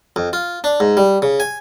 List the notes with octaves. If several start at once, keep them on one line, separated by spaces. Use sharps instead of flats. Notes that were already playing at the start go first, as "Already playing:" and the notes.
F2
F4
D4
G#2
G3
C#3
G#5